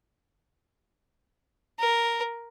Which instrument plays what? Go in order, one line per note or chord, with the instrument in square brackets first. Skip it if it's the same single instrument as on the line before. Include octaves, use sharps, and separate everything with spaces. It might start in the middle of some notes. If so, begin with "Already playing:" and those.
[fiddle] A#4